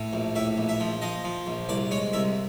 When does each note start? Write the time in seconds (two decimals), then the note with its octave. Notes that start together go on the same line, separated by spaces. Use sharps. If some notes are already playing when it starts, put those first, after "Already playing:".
Already playing: A2
0.13 A#1
0.36 A2 E5
0.57 A#1
0.69 E5
0.80 F3
1.02 F3 D#5
1.24 F3
1.47 A#1
1.69 C2 D5
1.91 G#3 C#5
2.13 C2 E5